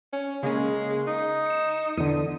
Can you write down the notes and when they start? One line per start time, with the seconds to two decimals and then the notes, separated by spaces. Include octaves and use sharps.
0.13 C#4
0.43 C#3 G#3 A#3 C#4
1.07 D#4
1.46 C#7 E7
1.97 E2 D3 D#7